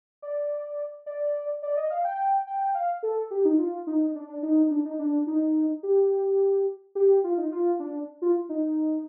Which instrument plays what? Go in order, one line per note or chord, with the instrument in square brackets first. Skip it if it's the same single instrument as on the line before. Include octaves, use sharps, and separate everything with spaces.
[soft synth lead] D5
D5
D5
D#5
F5
G5
G5
G5
F5
A4
G4
D#4
F4
D#4
D4
D4
D#4
D4
D#4
D4
D#4
G4
G4
F4
D#4
F4
D4
F4
D#4